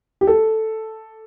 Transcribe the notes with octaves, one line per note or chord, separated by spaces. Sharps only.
G4
A4